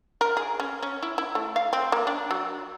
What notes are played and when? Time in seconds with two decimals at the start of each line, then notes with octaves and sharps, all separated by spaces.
0.21 A#4
0.37 G#4
0.60 C#4
0.83 C#4
1.03 E4
1.18 E4
1.35 A3
1.56 F5
1.73 C4
1.92 A#3
2.07 D4
2.31 F#3